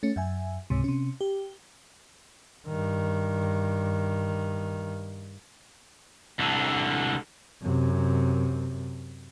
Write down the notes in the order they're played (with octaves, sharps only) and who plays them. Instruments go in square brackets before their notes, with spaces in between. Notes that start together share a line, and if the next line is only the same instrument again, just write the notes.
[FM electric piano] A3 C#4
F#2 E5 G#5
C#2 G#2 C3
C3 C#4
G4
[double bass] G2 D#3
[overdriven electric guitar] C2 D3
[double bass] F#2 C3